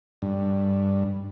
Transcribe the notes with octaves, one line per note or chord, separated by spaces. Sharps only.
G2